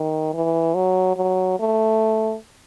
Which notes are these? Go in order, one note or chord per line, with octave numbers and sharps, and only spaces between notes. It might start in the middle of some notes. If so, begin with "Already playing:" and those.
Already playing: D#3
E3
F#3
F#3
A3